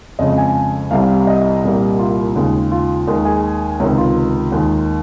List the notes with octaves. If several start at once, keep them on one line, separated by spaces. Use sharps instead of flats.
F2 C#3 G#3 D#5
G#5
C2 C3 G3 F5
D#5
C2 A#2 G3 A#3
F4
D#2 C#3 G#3
F4
D#2 D#3 G#3
G#4
C#2 C3 D#3 C#5
F4
D#2 D#3 G#3